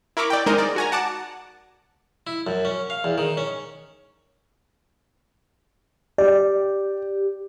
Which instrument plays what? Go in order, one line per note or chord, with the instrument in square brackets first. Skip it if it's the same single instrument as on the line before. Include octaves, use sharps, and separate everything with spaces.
[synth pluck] E4 A#4 B5 C#6 D6
D5 G5
G#3 D#4 A#4 C5 D#5
D5
F#4 G#5 A#5
F#5 A5 D6
[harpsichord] E4
F#2
C#4
F5
E2
D#3
C#4
[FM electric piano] G4 [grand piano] D5